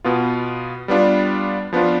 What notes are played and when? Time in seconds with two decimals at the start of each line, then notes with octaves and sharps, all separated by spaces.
0.04 B2 B3 F4
0.88 G3 B3 D4 F4
1.73 F3 B3 D4 F4